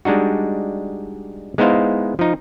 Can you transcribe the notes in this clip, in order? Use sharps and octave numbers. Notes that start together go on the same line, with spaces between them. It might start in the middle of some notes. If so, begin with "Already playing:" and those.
G3 G#3 D4 D#4 F#4
G#3 B3 D#4 E4 C5 F5
F3 D#4